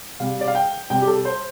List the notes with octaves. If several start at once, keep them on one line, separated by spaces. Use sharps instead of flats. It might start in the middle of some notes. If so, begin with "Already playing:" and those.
C3 G3 F5
D5
F5
G5
C3 G3 G5
G4
A4
C5